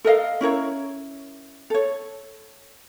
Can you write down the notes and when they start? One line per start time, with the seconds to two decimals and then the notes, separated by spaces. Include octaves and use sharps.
0.05 A4 A#4 D#5 F5
0.41 C#4 E4 A#4 C#5
1.70 A4 C#5